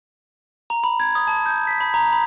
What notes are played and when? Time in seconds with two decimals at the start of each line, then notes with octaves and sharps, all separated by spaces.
0.70 A#5
0.84 B5
1.00 G#6
1.15 D#6
1.28 A5
1.46 G6
1.67 B6
1.81 B5
1.94 A#5
2.13 B5